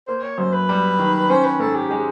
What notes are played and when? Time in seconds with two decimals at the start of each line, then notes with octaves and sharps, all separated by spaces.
0.08 A#3 C5
0.23 C#5
0.38 F#2 C5
0.53 B4
0.69 G3
0.99 D#3
1.29 C#4 C5
1.44 B4
1.59 G#2 A4
1.75 G4
1.90 G#3 G4